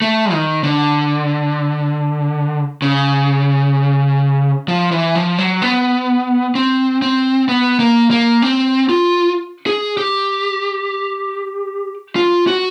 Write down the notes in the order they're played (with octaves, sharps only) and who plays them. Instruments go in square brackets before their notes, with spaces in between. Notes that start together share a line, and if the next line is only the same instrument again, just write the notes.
[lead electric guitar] A3
D#3
D3
C#3
F3
E3
F3
F#3
B3
C4
C4
B3
A#3
A#3
C4
F4
G#4
G4
F4
F#4